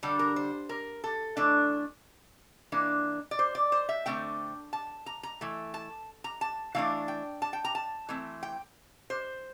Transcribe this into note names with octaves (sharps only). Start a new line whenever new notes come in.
D3 G3 D4 A4
A#4
C5
A#4
A4
E3 A3 D4
E3 A#3 D4
D5
C5
D5
C5
E5
D3 A3 C4 G5
A5
A#5
A#5
E3 A3
A5
A#5
A5
E3 A3 D4 F5
G5
A5
G5
A#5
A5
E3 A3 C4
G5
C5